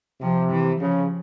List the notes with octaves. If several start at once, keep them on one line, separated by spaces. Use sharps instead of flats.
C3 F3
E3
C#3 F3